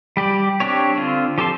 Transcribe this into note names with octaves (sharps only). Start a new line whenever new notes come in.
G3 G4 D5
C4 D4 G4 C#5
D3 C4 F4
F3 G4 A4 A5 C6